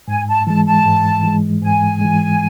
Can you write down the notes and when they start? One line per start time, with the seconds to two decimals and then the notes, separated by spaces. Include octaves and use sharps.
0.08 G#2 G#5
0.27 A5
0.46 E3 G#3 A5
0.66 A5
0.85 G#2
1.23 E3 G#3
1.62 G#2 G#5
2.01 E3 G#3